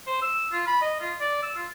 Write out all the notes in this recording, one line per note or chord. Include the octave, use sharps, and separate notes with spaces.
C5
E6
F4
B5
D#5
F4
D5
E6
F4